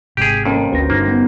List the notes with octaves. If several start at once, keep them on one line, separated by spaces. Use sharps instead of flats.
G#1 C3 G4 G#4
F2 A#3 C#4 A#4 C5
G1 D2 C#4 F#4 B4 C5 A#6
G2 D3 A#3 D#4 A#4 C5
B3